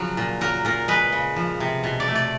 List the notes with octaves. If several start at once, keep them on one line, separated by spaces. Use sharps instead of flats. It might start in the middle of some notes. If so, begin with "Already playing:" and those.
Already playing: C#3 F3 F#3
A#2
F#3 A#4
A#2 A#4
G#3 B4
C#3
F3
C3
B2
D5
A3
D5